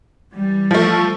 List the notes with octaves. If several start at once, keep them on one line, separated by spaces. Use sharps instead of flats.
E3 G3
F3 A3